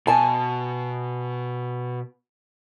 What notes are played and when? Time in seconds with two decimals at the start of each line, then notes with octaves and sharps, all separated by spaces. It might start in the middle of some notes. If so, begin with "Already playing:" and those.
0.07 B2 G#5 A5